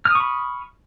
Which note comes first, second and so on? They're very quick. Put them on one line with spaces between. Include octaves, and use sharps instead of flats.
F6 D#6 C#6 B5